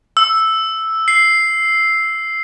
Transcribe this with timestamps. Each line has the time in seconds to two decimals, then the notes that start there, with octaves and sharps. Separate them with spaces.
0.17 E6
1.08 C7